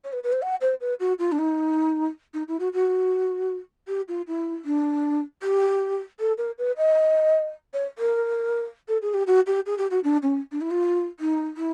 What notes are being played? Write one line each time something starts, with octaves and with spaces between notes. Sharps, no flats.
C#5
B4
B4
C5
F#5
C5
B4
F#4
F4
D4
D#4
D#4
E4
F#4
F#4
G4
F4
E4
D4
G4
A4
A#4
B4
D#5
C#5
A#4
A4
G#4
G4
F#4
G4
G#4
G4
F#4
D4
C#4
D4
E4
F4
D#4
E4